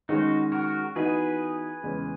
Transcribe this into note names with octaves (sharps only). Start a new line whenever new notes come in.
D#3 G#3 C#4 D#4 F#4
F#4 A#4
E3 B3 D#4 F#4 G#4 B4
E2 C#3 G#3 C#4